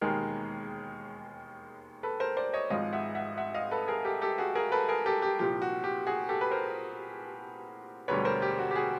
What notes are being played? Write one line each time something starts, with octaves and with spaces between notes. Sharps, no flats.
E1 D#2 D#3 G#3 G#4 A#4
A4 B4
A#4 C5
C5 D5
C#5 D#5
G#1 G#2 F3 G#3 D#5 F5
E5 F#5
E5 F#5
E5 F#5
D#5 F5
A4 B4
G#4 A#4
G4 A4
G4 A4
F#4 G#4
G#4 A#4
A4 B4
G#4 A#4
G4 A4
G4
C2 A#2 F3 G4
F#4
G4
F#4 G#4
G4 A4
B4
A#4 C5
E1 D2 D3 G3 B4 C#5
A#4 C5
G4
F#4
G4
F#4 G#4